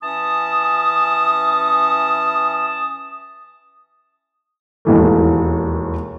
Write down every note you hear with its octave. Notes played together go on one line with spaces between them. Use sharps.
E3 C#4 A5 D#6
E1 D#2 E3 A3